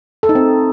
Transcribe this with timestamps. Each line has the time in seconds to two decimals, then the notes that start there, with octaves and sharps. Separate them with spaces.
0.23 A4
0.29 D#4
0.35 C4